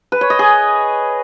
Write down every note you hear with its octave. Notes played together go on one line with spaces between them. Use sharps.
B4
C#5
D#5
G#4